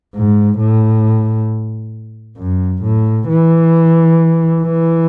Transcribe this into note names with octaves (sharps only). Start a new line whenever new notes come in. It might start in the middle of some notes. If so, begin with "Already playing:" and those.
G#2
A2
F#2
A2
E3
E3